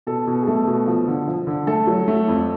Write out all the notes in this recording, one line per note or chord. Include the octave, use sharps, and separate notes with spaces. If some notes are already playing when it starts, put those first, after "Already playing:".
B2 A4
B2
G#4
A3 A4
B2
F3
D3
F3
D3
A3 A4
F#3
A3
F2